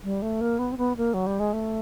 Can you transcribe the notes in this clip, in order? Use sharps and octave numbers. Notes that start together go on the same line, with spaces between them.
G3
A3
A#3
B3
C4
B3
A#3
F#3
G3
G#3
A3